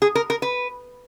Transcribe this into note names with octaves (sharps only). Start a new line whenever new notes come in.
G#4
A#4
A#4
B4